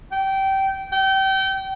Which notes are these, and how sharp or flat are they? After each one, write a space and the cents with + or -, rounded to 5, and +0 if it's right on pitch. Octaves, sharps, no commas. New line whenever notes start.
G5 -20
G5 -30